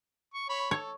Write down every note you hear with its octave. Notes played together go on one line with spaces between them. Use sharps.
C#6
C#5 B5
A4 C#5